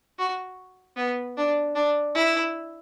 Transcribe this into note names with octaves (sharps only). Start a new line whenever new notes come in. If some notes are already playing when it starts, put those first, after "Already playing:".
F#4
B3
D4
D4
E4